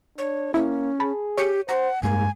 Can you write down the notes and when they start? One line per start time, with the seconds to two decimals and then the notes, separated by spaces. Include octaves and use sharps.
0.18 D4 C#5
0.54 A#3 C#4 E4
1.00 G#4 A5 B5
1.38 G4 C#5 C#7 D#7
1.69 C5 F#5 A#5
2.03 G2 G#3 A#3 G#5